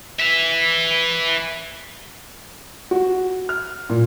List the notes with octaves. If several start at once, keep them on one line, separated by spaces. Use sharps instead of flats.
B4 E5
F#4
F6
A#2